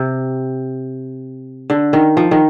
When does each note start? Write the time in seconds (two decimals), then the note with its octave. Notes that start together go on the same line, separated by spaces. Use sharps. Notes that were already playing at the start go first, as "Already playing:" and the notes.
Already playing: C3
1.70 D3
1.93 D#3
2.17 F3
2.31 D#3